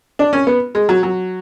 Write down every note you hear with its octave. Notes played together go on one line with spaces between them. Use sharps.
D4
C#4
B3
G#3
F#3
F#3